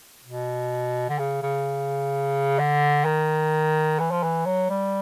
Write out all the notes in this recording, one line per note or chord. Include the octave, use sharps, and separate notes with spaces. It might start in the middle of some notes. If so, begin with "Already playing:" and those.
B2
D3
C#3
C#3
D3
D#3
E3
F3
E3
F#3
G3